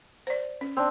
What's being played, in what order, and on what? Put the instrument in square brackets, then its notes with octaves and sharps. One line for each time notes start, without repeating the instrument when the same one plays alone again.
[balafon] C5 D5
C#4
[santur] C4 D4